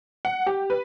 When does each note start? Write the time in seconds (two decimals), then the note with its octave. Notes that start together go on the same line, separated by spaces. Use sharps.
0.25 F#5
0.46 G4
0.70 B4